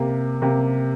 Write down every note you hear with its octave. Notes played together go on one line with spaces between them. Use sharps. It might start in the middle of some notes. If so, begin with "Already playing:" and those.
Already playing: C3 A#3 G4
C3 A#3 G4